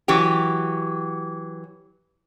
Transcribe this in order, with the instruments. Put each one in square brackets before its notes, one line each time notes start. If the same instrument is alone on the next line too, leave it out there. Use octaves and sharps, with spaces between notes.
[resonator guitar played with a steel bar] E3 F#3 G4